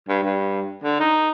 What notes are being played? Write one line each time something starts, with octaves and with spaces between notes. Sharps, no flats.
G2
G2
D3
D#4